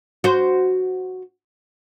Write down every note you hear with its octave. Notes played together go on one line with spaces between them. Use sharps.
F#4 C5